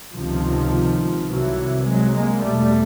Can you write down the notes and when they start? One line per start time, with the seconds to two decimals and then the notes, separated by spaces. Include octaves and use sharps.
0.16 C#2 C3 D#3 F3
1.29 C2 C3 E3 F#3
1.85 F#3 G#3
2.14 G#3 A#3
2.42 E2 B2 G3 A3